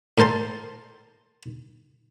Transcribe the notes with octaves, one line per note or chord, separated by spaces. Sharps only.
A2 A#4 C5 A5 C6